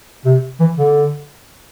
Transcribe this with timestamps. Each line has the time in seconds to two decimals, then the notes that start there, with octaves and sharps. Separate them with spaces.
0.25 C3
0.60 E3
0.78 D3